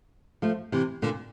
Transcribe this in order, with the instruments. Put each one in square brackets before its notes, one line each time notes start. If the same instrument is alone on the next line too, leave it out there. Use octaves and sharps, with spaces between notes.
[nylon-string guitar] F3 A3
C3 E3
A#2 D3